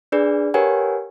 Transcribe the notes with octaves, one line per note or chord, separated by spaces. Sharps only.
D4 G#4 B4 D5
G4 A#4 B4 C#5 F#5 G#5